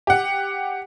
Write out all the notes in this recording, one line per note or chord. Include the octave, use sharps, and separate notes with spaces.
G4 F#5